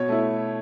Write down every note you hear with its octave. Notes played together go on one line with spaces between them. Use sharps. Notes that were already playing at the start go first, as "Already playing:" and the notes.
Already playing: B2 C#5
A3 E4